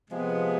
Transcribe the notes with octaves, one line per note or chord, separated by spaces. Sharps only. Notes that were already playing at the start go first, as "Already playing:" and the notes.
C3 F3 G#3 B3